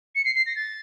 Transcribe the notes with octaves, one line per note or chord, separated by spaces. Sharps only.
C#7
C7
C7
A#6
A6